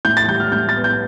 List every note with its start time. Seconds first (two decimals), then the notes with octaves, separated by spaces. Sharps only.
0.05 A2 G6
0.17 A6
0.28 G3 G6
0.40 F6
0.52 A2 G6
0.69 A6
0.76 B3
0.84 G6